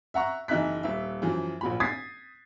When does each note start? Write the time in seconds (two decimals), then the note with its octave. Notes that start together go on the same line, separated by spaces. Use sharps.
0.14 E5 F#5 A#5 C#6
0.48 F#1 E3 D#4 E5 F#6 B6
0.83 D#1 E5
1.22 F#2 E3 F3
1.61 A#1 A#2 B5
1.80 D#6 G#6 A6 B6 C7